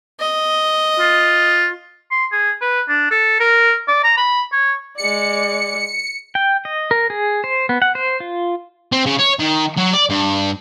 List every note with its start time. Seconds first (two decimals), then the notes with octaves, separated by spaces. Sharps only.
0.20 D#5
0.99 F4
2.11 C6
2.32 G#4
2.61 B4
2.89 D4
3.11 A4
3.40 A#4
3.88 D5
4.04 A#5
4.17 B5
4.52 C#5
4.98 G#3 D5 C#7
6.35 G5
6.65 D#5
6.91 A#4
7.10 G#4
7.44 C5
7.69 B3
7.82 F#5
7.95 C5
8.20 F4
8.92 C4
9.06 C#3
9.19 C#5
9.39 D#3
9.77 F#3
9.93 D5
10.10 G2